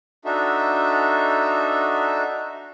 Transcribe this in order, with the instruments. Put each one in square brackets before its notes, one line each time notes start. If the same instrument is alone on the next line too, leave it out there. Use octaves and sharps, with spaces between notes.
[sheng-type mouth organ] D4 D#4 F#4 A4 E5